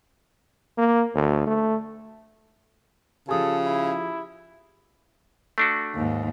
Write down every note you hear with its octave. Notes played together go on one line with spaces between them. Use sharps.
A#3
D2
A3
C#3 F3 G4 A4 G#5 D#6
E4
A3 D4 F#4
D#2 G#2